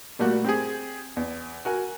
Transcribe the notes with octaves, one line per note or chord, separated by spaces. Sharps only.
A#2 G3 A3 A#3 F#4
C4 G4 G#4
E2
F#4 A#4 G#5